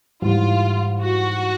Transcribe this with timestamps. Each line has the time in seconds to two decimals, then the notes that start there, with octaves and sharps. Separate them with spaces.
0.22 G#2 E3 G3 F4
1.03 F#4